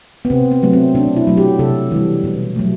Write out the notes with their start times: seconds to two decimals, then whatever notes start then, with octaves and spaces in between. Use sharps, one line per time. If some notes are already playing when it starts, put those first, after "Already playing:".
0.25 B3
0.30 C3 C4
0.52 B3
0.63 F#3 A3
0.73 C4
0.95 B2 D4
1.16 E4
1.27 F#3 A3
1.37 G4
1.59 C3 A4
1.92 E3 G3
2.24 B2
2.56 F#3 A3